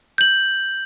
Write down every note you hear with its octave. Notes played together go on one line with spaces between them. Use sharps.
G6 F#7